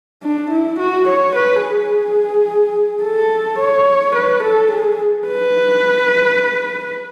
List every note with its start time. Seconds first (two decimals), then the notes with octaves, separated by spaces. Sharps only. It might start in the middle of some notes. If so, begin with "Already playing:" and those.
0.23 D4
0.51 E4
0.79 F#4
1.08 C#5
1.35 B4
1.63 G#4
3.04 A4
3.59 C#5
4.15 B4
4.43 A4
4.71 G#4
5.28 B4